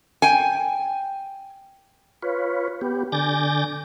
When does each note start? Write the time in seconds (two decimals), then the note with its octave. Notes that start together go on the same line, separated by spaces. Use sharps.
0.22 G5 G#5
2.22 F4 B4 C#5
2.81 B3 G4
3.12 D3 G#5 D6 G6 A6 A#6